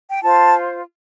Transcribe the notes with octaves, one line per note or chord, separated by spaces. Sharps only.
G5
F4 C5 A5